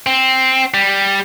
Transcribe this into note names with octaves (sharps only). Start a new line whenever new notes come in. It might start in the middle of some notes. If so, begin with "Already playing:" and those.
C4
G3